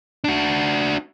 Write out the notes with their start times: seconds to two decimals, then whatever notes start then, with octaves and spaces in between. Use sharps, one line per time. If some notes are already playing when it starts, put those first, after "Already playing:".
0.24 D4 F#4